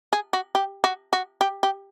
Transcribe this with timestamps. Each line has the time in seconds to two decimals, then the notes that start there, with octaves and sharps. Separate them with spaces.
0.13 G#4
0.33 F#4
0.55 G4
0.84 F#4
1.13 F#4
1.41 G4
1.63 G4